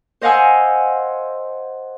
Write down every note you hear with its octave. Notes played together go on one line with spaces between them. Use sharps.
C5 D#5 F5 F#5 G#5 E6